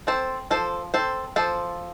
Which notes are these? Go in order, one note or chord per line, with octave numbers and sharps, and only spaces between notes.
C4 A4 C5
F3 A4 C5
C4 A4 C5
F3 A4 C5